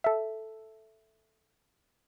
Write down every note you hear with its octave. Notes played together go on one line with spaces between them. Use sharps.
A4 E5